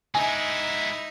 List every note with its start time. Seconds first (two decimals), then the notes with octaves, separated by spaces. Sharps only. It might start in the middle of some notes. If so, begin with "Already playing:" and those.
0.15 G#3 D#4 E4 E5 G#5